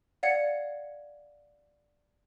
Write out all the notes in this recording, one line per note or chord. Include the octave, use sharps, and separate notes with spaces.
D5 F5 F#5 G#6 C#7